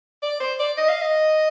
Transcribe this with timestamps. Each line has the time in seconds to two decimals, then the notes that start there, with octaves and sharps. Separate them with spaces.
0.22 D5
0.40 C5
0.59 D5
0.77 D#5
0.89 F5
1.02 D#5